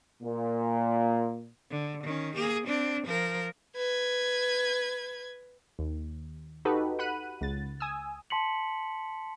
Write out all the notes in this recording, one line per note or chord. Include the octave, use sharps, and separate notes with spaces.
A#2
D3
D#3 C#4
A#3 G#4
C4 D4
F3 A#4
B4 G#6
D#2
D#4 F#4 G4 A4 B4
F#5 B5 F#6 D#7
C#2 A6
G#5 D#6 E6
A5 C6 B6 C#7 F#7